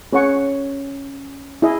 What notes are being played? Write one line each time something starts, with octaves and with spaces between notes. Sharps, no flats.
C#4 G#4 C#5 F#5 C#6
E4 G#4 D#5